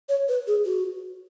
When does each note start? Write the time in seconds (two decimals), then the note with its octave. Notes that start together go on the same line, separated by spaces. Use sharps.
0.09 C#5
0.28 B4
0.47 G#4
0.66 F#4